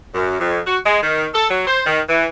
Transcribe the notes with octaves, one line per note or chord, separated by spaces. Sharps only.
F#2
F2
F#4
G#3
D#3
A4
F#3
C5
D#3
E3